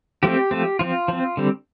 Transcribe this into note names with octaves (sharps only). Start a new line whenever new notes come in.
F3 A3 C4 G4
F3 A3 C4
F3 C4 F4
F3 C4
D3 G3 C4